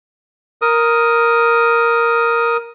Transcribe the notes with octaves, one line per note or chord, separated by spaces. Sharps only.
A#4 D#6